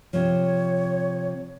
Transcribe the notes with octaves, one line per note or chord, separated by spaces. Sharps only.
C3 F3 C#5